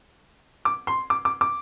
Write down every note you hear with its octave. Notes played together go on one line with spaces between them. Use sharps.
D6
C6
D6
D6
D6